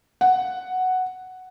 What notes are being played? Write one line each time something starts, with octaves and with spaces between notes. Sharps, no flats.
F#5